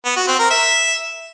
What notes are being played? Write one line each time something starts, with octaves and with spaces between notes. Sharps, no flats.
B3
F#4
C4
A#4
E5